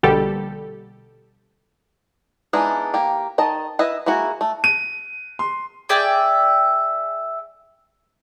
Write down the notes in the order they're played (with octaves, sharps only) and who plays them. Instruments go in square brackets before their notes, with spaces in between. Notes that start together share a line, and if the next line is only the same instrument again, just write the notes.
[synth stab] A#1 B2 D3 G3 G4 A4
[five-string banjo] E3 G#3 B3 D4 D#4
A#3 G4
D#3 D#5 A5
E4 B4 D#5 E5
G#3 A#3 E4 F#4
A3
[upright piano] D#7
C6
[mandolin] G#4 D5 E5 G5